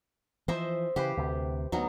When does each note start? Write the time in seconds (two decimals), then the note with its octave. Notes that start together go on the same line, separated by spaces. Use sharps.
0.48 E3 F3 C5 D#5 E5
0.96 C#3 E3 G4 B4 C5
1.17 D2 C3
1.72 D2 F#3 B3 D#4